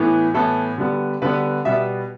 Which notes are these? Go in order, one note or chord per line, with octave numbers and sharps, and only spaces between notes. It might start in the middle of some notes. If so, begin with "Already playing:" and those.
Already playing: A2 E3 B3
A2 E3 B3 A4
D3 G3 B3
D3 G3 B3 B4
B2 G3 B3 E5